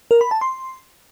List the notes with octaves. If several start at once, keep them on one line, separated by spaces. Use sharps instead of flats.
A#4
B5
A5
C6